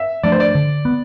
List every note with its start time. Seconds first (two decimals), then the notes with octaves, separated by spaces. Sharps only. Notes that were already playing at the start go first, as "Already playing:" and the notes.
Already playing: E5
0.23 F3 A3 D4 D5
0.32 C5
0.40 D5
0.55 D3
0.85 B3